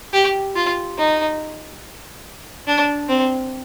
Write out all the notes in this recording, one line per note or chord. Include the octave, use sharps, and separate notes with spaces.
G4
F4
D#4
D4
C4